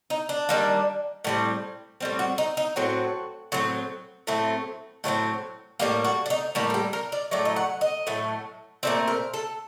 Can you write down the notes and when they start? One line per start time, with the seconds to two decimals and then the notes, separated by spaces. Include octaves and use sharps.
0.10 D#4
0.29 D4
0.49 D#3 G3 A#3
1.24 A2 G3 C4
2.00 A2 G3 C4
2.19 F#4
2.38 D#4
2.57 D#4
2.76 A2 F#3 C4 F#4
3.52 A2 F#3 C4
4.27 A2 F#3 A3 C4
5.04 A2 F#3 A3 C4
5.79 A2 G3 A#3 G4
6.04 F#4
6.26 D4
6.30 D#4
6.55 A2 G3 A#3 F#4
6.70 A4
6.74 G4
6.93 A#4
7.12 D5
7.31 A2 F#3 A3 D5
7.45 D#5
7.56 F#5
7.81 D#5
8.07 A2 F#3 A3
8.83 A#2 A3 C4 D5
9.08 A#4
9.34 A4